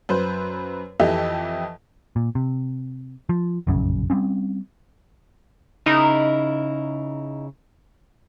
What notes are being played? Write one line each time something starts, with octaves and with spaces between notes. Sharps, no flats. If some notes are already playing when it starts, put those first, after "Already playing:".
F#2 B4 C5
F2 E3 G4 A4 D#5 E5
A#2
C3
F3
F1 A#1 F#2 C#3
G3 A3 C4 C#4
C#3 D#4 E4 A#4